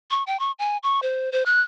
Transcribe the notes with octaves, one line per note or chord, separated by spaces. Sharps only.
C#6
G5
C#6
G#5
C#6
C5
C5
F#6